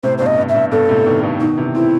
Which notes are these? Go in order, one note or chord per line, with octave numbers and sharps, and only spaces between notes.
A2 C3 C5
G2 B2 C5
D#5
G2
E5
G2
G2 B2 A4
A2 C3
B2 D#3
G2 B2
B2 D#3 D#4
C3 E3
A3 C4 E4